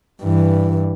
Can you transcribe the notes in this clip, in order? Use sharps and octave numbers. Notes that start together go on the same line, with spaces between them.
G2 E3